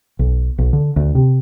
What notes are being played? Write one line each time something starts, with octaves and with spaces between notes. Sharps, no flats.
B1
B1
D3
D2
C3